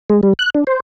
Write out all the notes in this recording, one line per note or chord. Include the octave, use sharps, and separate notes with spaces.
G#3
G3
F#6
D4
C5